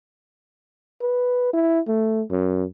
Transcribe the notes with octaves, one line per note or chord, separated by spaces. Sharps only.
B4
E4
A3
F#2